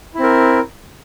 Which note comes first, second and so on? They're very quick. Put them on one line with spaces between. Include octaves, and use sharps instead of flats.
E4 C4 A#4